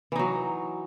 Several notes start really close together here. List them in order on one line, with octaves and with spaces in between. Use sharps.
E3 D#4 F#3